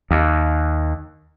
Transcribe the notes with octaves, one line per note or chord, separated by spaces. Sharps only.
D#2